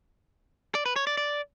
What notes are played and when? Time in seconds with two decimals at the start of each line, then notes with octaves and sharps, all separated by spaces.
0.75 D5
0.86 B4
0.96 C#5
1.07 D5
1.17 D5